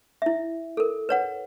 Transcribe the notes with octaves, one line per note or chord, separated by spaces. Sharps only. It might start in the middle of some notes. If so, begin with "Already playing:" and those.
E4 E5
A4 A#4
B4 C#5 F#5